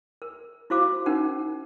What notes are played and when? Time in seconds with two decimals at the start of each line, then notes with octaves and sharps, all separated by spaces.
0.22 A#4
0.70 E4 F#4 C5 F5 D6
1.06 C#4 D#4 A#4 F#5